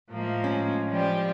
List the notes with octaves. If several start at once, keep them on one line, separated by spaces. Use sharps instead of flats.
A2 F3 G#3 A#3
C#4
F3 G3 G4